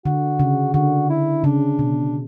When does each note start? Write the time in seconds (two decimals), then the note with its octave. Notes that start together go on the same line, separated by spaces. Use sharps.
0.05 D3 F#4
0.39 C#3
0.74 D3 F#4
1.10 E4
1.44 C#3 D4
1.79 B2